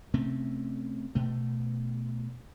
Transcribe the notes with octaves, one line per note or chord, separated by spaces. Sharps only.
C3 A3 C4 C#4
B2 A3